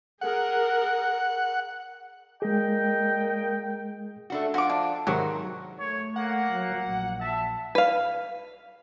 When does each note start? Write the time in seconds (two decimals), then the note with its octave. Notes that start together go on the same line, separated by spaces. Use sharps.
0.21 G#4 A#4 F#5
2.42 A#2 G#3 G#4 D#5 G5
4.30 A3 D4 F#4
4.54 F3 F4 F#4 D6
4.70 D4
5.07 G#1 C3 D#3 F#3 F#4 G4
5.80 A3 C#5
6.16 A#3 F#5
6.52 F#3
6.86 A#1
7.21 E5 A5
7.75 B4 F5